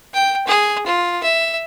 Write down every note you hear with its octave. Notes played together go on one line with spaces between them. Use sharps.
G5
G#4
F4
E5